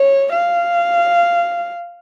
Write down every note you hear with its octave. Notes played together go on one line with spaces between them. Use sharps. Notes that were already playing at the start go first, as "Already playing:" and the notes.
Already playing: C#5
F5